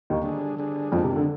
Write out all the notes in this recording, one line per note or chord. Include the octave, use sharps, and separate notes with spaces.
D#2 D#3
D3 G3 D4 G#4
D3 G3 D4 G#4
F2 D#3 F3 G#3 D4
C3
D3